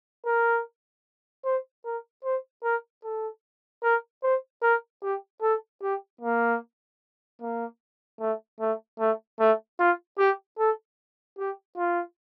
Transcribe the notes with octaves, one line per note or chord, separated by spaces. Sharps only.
A#4
C5
A#4
C5
A#4
A4
A#4
C5
A#4
G4
A4
G4
A#3
A#3
A3
A3
A3
A3
F4
G4
A4
G4
F4